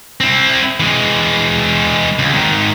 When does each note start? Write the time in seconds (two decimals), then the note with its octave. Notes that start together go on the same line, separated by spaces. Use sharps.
0.20 C4 E4
0.80 E3 G#3
2.19 C#2
2.34 G#2 D#3